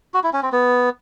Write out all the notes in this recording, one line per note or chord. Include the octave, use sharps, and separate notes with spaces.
F#4
E4
C#4
C4
B3